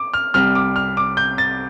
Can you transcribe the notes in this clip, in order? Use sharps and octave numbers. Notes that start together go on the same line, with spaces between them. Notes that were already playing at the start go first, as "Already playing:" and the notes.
Already playing: D6
F6
C2 C3 G3 F6
D6
F6
D6
G6
A6